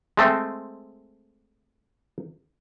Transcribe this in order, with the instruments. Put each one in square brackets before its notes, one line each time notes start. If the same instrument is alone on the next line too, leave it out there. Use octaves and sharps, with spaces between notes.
[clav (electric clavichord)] G#3 A3 C4 C5